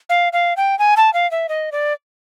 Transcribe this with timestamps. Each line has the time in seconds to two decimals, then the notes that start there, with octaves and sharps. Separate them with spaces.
0.09 F5
0.33 F5
0.57 G5
0.79 G#5
0.97 A5
1.13 F5
1.31 E5
1.49 D#5
1.72 D5